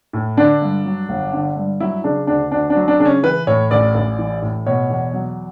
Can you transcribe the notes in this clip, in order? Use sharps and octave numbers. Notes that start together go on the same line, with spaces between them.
A2
D3 D4
G2
F#3
G1
D3
G2
F#3 E4
C#3 D4
D2 D4
D2 D4
D4
F#3
D4
C#3 D4
C#4
E3 B4
A2 C#5
A1 D5
A1
E3
A2
B2 C#5
E2
F#3